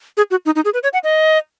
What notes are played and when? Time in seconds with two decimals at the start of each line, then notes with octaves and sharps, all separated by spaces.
0.17 G#4
0.31 F#4
0.46 D#4
0.56 D#4
0.65 G#4
0.74 B4
0.83 C#5
0.93 F#5
1.04 D#5